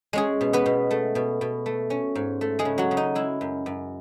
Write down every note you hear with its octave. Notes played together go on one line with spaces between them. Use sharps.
G#3 C#4 G#4
B2
B3 B4
B2
A3
B2
B2
A3
C#4
G#2
A3
G#3 G#4
C#3
F#3 F#4
C#3
D#4
G#3 E4
F#2
F#2